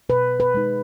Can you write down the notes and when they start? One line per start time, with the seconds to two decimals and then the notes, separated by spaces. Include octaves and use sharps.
0.09 B2 B4
0.40 B4
0.54 G#3 D#4